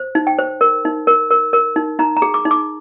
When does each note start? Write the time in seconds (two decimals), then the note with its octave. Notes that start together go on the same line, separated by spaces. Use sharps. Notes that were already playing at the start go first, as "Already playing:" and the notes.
Already playing: C5
0.15 D#4
0.27 G5
0.39 C5
0.61 A#4
0.85 D#4
1.07 A#4
1.31 A#4
1.53 A#4
1.76 D#4
1.99 D#4 A#5
2.17 A#5
2.22 G#4
2.34 D6
2.45 D#4
2.51 D6